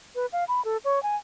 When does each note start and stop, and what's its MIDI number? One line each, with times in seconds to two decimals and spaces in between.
0.15 0.26 71
0.33 0.44 77
0.48 0.64 83
0.65 0.77 69
0.85 1.02 73
1.03 1.16 80